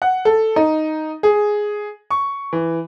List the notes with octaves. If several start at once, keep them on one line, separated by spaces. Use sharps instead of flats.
F#5
A4
D#4
G#4
C#6
E3